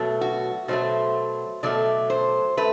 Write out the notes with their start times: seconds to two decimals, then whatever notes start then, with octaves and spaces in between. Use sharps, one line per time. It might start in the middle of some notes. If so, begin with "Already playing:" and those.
Already playing: B2 F#3 A3
0.21 F#4
0.68 B2 F#3 A3 C5
1.63 B2 F#3 A3 D5
2.10 C5
2.57 A3 B4